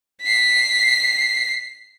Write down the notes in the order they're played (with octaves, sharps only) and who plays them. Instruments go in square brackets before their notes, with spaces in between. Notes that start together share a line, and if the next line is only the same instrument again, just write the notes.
[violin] B6 C7